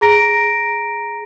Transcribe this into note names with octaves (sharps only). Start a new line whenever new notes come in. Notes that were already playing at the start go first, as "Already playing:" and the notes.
G#4 A#5 A#6 D7